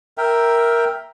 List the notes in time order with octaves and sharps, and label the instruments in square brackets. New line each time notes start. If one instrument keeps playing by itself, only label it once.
[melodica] A#4 E5 G5